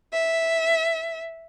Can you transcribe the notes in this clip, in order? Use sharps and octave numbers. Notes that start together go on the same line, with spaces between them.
E5